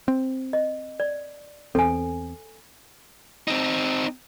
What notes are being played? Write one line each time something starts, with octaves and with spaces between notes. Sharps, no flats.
C4
D#5
D5
E2 C4 A4 G#5
C4 D#4